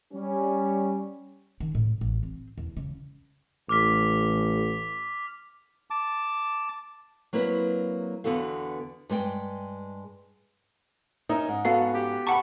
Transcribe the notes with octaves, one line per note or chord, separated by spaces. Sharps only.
G3 C#4
D#3
A2
A1
C4
E2
C#3
A1 D6 F6 B6
A5 D6
F#3 A#3 C4 E4 B4
E2 D3 B3 F#4 A4 F5
G2 G#3 A#4 G5
C#4 D#4 A#4 E5
G#2
B3 C#4 F#4 A4 F5
G4
F#5 A5 B5 C#6